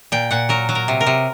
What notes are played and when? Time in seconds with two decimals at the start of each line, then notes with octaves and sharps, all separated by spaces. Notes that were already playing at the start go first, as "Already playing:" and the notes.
0.12 A#2 G5
0.31 A#2 F#5
0.49 F#3 A#4
0.69 F#3
0.75 A#4
0.88 C3
1.00 A#4
1.06 C3